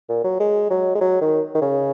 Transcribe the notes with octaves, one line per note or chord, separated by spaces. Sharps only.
A#2
F#3
G#3
F#3
G#3
F#3
D#3
D#3
C#3